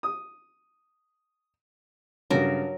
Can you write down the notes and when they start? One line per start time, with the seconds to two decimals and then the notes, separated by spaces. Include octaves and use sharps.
0.03 D#6
2.30 G2 C#3 F#3 A#4